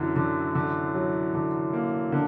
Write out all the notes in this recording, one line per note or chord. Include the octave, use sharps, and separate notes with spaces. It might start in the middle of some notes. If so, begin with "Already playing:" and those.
Already playing: F#2 D3 E3 F#3
D3
D3
F#3
D3
A#3
D3